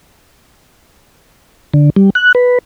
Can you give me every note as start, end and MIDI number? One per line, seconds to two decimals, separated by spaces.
1.74 1.90 50
1.96 2.10 55
2.15 2.32 90
2.35 2.59 71